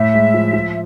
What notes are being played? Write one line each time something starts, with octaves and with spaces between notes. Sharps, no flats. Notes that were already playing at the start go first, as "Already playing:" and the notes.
Already playing: A2 E5
G#3
F3
F3